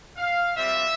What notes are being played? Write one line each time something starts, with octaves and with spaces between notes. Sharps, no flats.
F5
G3 C4 F4 E5